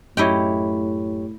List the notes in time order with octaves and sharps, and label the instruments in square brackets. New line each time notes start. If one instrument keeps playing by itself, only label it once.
[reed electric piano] F#2 G4 C#5 [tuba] A2 [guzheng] E4 D#5 G5